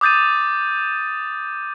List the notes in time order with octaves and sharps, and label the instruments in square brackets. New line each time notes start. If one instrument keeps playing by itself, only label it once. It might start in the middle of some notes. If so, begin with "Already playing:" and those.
[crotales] D6 D#6 G6 A6 D#7